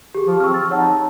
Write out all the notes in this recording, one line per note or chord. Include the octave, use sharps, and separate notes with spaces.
G4 G#4
F3
C4 C#6 E6 F6
A6
D#4 C#5 F#5 A5